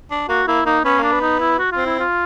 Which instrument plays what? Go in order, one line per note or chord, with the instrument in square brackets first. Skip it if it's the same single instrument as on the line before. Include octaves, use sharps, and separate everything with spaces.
[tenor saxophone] D4
[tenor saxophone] A#3 [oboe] F#4
[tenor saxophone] A#3 [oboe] E4
[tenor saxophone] A#3 [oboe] D#4
[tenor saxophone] B3 [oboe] C#4
[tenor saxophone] A#3 [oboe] D4
[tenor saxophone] B3
[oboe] D#4
E4
F#4
[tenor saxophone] C4 [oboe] F4
[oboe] E4
F4